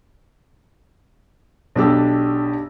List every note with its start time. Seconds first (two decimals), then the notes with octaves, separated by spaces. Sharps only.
1.76 B1 D4 G4 E6